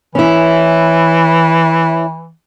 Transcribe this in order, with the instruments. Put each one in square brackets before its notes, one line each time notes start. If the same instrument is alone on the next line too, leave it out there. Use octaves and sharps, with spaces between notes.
[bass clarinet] E3 [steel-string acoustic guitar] C#4 E4